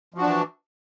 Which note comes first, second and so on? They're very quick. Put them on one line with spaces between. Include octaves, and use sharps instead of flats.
F3 F#4 D4 E3